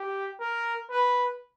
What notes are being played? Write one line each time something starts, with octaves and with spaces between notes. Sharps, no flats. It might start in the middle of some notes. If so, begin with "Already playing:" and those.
Already playing: G4
A#4
B4